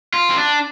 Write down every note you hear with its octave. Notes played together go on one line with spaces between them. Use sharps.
F4
C4
D4